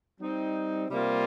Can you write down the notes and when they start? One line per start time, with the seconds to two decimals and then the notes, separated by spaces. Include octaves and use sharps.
0.19 G3 C4 D#4
0.89 C3 G3 A#3 F4